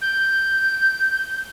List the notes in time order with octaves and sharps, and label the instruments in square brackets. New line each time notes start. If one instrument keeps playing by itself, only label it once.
[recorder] G6